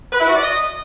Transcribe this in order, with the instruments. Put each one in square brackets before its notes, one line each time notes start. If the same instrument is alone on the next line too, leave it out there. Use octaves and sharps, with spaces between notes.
[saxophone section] B4
E4
F#4
D5
D#5